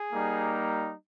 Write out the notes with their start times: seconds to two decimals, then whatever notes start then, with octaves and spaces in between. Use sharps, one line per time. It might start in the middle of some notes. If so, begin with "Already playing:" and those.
Already playing: G#4
0.13 G3 A#3 D#4